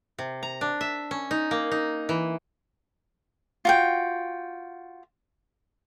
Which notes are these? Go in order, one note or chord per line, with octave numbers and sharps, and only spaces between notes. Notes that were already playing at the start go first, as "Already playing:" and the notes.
C3
A#5
D4
E5
C#4
D#4
A#3
D#4
E3
F4 F#4 G5